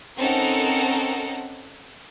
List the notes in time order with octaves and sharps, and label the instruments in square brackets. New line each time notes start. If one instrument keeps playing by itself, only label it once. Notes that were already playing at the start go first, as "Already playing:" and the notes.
[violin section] C4 C#4 D#4 A4 A#4 F#5